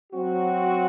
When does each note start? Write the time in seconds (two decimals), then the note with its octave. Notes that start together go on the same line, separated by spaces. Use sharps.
0.13 F#3 C4 F#4